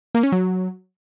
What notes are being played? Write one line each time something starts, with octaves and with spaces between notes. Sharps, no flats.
A#3
C#4
F#3